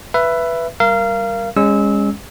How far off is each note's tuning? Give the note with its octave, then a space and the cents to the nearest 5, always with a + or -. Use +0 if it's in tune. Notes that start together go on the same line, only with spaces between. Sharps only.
B4 +0 E5 +20
G3 +5 A#4 +0 F5 -25
G#3 -25 C#4 +0 E6 -20